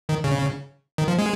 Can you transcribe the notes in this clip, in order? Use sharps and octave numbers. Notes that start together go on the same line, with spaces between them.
D#3
C#3
D#3
F3
G#3